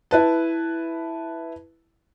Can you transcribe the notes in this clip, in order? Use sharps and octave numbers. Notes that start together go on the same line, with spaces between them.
E4 B4 A5